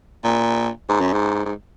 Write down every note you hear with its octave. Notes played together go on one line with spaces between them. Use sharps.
A#2
G#2
F#2
G#2
G#2